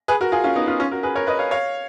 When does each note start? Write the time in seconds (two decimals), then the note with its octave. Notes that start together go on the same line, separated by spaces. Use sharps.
0.08 G#4 B4
0.21 F#4 A#4
0.32 F4 G#4
0.44 C#4 F4
0.56 B3 D#4
0.68 C#4 F4
0.80 C#4 F4
0.91 F#4 A#4
1.03 G#4 B4
1.16 A#4 C#5
1.27 B4 D#5
1.39 C#5 F5
1.51 C#5 F5